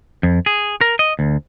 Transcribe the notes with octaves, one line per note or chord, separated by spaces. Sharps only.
F2
G#4
A#4
D#5
D2